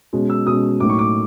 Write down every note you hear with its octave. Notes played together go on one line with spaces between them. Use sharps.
B2 G#3 C#4
E6
B2 G#3 C#4 D#6
A2 F#3 A#3 D#4 D6
C#6
D6